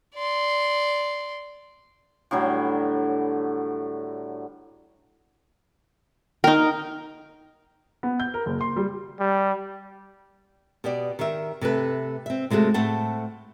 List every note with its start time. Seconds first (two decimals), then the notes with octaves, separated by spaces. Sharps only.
0.15 D5 C6
2.31 A2 D3 F#3 G3
6.44 D#3 D#4 A#4 G5
8.03 B3
8.20 G6
8.34 A#4
8.46 F#1
8.61 C6
8.76 G3
9.20 G3
10.84 B2 B3 G4 D5
11.19 D#3 G4 A#4 E5
11.61 C3 A3 A4 B4
12.26 C4 E5
12.50 C3 G#3 A3 F#4 A4
12.74 A2 A3 C4 F#5 A5